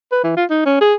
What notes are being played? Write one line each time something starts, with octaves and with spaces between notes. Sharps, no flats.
B4
E3
F4
D#4
C#4
G#4